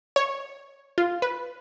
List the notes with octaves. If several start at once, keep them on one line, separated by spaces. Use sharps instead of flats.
C#5
F4
B4